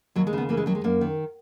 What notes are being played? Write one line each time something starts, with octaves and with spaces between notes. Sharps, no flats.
D#2 F#3
G#3
C#3 B3
E3 A#3
G#3
D#2 F#3
G#3
F#2 A#3
D#3